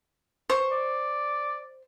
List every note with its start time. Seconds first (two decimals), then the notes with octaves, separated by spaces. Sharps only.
0.50 C5 C#6
0.71 D5